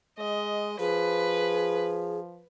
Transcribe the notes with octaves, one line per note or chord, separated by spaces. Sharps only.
G#3 D#5
F3 G#4 B4